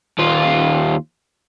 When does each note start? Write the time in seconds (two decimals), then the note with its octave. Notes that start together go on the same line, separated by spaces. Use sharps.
0.19 D#2 F4